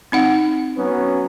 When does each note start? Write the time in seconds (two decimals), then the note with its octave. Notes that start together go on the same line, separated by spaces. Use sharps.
0.12 C4 D#4 F#5
0.77 F#3 B3 C#4